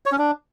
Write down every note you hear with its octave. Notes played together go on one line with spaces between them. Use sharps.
C#5
C#4
D4